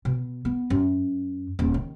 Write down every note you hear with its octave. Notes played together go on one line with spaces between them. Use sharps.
B2
B3
F#2
D#1
D#3